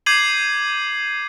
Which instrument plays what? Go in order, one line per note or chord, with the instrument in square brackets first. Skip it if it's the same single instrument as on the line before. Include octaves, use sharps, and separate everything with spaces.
[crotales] D6 G6 G#6 C7 D#7 F#7